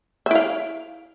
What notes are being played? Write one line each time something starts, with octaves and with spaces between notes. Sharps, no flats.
E4 E5 F5